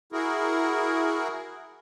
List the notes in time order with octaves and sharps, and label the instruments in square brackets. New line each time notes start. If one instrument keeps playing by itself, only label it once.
[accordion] E4 F#4 G#4 A#4